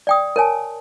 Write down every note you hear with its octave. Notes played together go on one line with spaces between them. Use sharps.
D5 G5 D#6
A#4 C#5 G#5 A5